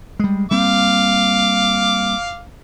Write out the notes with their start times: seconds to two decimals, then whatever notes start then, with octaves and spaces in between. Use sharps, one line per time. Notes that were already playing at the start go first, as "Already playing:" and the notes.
0.20 G3 G#3
0.51 G3 A#3 C4 F5 D6